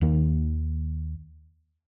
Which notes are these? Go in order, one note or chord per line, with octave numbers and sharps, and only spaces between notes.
D#2 D#3 A#3